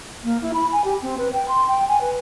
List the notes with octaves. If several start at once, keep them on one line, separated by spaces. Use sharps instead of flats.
A#3
E4
B5
G#5
G4
C4
B4
G5
C6
G5
G#5
B4